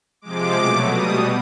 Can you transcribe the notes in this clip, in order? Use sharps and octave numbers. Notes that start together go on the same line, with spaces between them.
C3 F3 G#3 D6
B2 F#3 A3
B2 G3 D#6